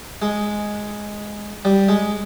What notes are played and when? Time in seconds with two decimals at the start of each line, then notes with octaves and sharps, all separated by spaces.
0.22 G#3
1.65 G3
1.89 G#3